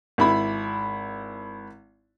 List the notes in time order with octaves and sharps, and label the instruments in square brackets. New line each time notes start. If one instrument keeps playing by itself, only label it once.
[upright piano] G#1 E4 B5